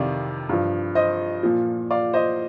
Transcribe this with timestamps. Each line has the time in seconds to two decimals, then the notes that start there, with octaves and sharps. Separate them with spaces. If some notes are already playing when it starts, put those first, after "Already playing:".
Already playing: F2 C3 D#3 D5 F5
0.49 G2 F3
0.95 C5 D#5
1.43 A#2 F3
1.91 D5 F5
2.13 C5 D#5